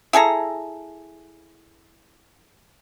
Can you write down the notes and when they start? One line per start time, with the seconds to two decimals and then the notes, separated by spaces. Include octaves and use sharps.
0.13 E4 G#4 A4 A#5